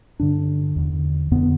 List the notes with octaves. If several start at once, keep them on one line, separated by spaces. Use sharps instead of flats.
G2 D3 D4
E2 D3
F2 D3 B3